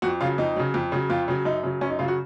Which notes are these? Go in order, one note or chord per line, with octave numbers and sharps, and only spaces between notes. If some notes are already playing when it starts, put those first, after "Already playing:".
F2 F#4
C#3 F#3 F4
F2 D#4
C#3 F#3
F2
C#3 F#3
F2 F4
C#3 F#3
F#2 D#4
C#3 F#3
F#2 C#4
D#4
C#3 F#3 F4
F#4